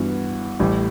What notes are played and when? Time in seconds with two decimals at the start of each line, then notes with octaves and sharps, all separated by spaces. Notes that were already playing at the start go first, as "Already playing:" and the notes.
Already playing: G2 E3 B3 F#4
0.60 A1 A2 G3